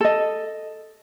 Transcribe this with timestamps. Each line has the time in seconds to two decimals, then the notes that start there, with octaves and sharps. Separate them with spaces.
0.01 A4 D#5